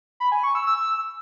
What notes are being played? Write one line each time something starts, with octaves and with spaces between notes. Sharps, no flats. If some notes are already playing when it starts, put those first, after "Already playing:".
B5
G#5
C#6
E6
E6